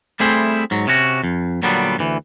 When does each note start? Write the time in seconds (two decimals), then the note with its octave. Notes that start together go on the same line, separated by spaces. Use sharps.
0.20 G3 A3 C4 E4 G#4 C5
0.71 G#2 F#3
0.87 C3 C#4 F#4
1.24 F2
1.63 A#2 D3 F#3 G3 B3
1.99 D2 E3